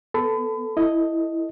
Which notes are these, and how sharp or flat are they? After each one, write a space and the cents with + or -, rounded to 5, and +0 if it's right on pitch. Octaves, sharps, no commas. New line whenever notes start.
B3 +0 A4 +0 B5 +35
E4 +0 A4 +15 D#5 +0